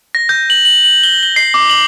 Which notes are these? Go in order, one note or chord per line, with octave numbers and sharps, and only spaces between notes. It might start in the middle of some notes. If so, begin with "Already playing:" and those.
A#6
G6
F#7
F#7
F#7
G7
G7
C7
D6
F#7